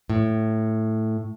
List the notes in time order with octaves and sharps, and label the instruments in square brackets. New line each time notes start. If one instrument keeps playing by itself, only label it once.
[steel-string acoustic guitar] A2